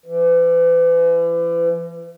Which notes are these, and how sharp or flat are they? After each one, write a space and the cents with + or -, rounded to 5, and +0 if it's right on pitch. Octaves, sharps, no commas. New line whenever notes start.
E3 +40